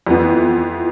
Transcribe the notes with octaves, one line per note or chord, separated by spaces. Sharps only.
F2 E3 B3